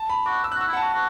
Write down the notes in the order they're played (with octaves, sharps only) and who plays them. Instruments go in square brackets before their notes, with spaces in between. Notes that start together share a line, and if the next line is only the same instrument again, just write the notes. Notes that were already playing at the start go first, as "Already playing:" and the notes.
Already playing: [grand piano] A5
B5
[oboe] F#4 [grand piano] D6
[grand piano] E6
F#6
[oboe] F#4
[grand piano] E6
[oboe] E4 [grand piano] F#5
[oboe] F#4 [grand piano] A5
[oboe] F#4